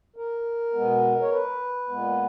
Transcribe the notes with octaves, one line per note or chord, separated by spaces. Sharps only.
A#4
B2 G#3 B3
C#5
B4
A#2 G#3 B3